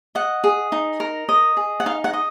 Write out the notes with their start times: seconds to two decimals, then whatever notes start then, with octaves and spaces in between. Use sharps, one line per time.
0.15 D#5 F#5
0.44 G#4
0.72 D#4
1.00 A#4
1.29 D#5
1.57 G#4
1.80 F#5
1.86 D#4 F5
2.04 F#5
2.13 D#5